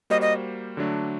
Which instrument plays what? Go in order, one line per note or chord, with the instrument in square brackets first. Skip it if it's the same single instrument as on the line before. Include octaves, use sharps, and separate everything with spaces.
[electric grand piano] G3 A#3 F#4 C5 [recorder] D#5
[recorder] D#5
[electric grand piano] D3 F#3 A3 D4